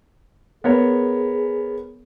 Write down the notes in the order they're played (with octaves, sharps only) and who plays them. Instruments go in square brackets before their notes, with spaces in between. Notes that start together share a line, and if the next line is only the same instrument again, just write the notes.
[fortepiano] B3 A#4 C#5 [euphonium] G#4